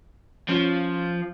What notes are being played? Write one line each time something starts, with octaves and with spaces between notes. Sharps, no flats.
F3 C#4